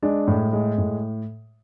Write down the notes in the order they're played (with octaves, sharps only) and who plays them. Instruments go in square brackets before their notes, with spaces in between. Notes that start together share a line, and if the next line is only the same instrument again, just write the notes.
[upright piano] G#3 D4
A2
G#3
A2